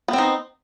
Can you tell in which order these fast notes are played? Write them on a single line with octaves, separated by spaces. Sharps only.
B3 C4 D#4